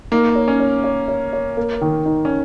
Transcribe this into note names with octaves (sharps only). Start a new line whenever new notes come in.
A#3 D#4
C#5
C#4
C#5
C#5
C#5
C#5
A#3
D#3
D#4
C#4